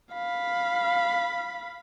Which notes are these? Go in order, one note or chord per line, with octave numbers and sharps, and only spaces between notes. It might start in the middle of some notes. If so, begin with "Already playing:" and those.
F5 B5